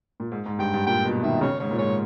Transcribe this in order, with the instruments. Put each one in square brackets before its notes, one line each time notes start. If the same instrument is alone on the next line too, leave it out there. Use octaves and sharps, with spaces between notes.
[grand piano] A#2
G#2
G#2
[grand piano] G2 [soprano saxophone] G5
[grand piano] G2
[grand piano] A#2 [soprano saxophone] G5
[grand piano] B2
[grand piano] D#3 [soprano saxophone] E5
[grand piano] C#3 [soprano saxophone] C#5
[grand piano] G#2 [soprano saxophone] C#5
[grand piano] A#2
[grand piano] G#2 [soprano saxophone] C#5